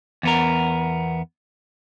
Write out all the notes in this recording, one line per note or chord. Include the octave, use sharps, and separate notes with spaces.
E2 B3 A#4